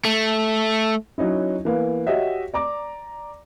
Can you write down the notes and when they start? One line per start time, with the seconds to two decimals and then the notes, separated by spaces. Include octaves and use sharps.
0.05 A3
1.18 F#3 C#4 D#4 E4
1.65 E3 A#3 B3
2.06 F#4 G4 C#5 D#5 E5 F#5
2.54 D5 A#5 D6